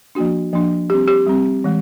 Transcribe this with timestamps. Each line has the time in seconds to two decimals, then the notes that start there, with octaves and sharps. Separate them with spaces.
0.15 F3 A#3 D4 F#4
0.53 F3 A#3 D4
0.90 G3 C4 G4
1.08 G4
1.27 G3 C4
1.64 E3 G#3